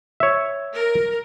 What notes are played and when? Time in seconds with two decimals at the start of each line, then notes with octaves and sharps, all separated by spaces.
0.20 C#5 E5
0.76 A#4